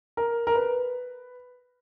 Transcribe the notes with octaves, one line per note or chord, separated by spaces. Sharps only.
A#4
A#4
B4